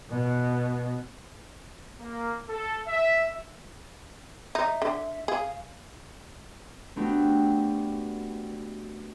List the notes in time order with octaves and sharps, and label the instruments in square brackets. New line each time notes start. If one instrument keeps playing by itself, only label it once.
[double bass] B2
[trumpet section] A#3
A4
E5
[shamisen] D#4 [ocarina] E5
[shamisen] D3
[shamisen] G#4 [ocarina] F5
[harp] A3 B3 C4 D4 F#4 G4